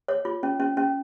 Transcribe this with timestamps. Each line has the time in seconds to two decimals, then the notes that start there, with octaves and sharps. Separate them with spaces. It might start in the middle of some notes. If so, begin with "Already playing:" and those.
0.08 C#5
0.25 F4
0.43 C#4
0.60 C#4
0.77 C#4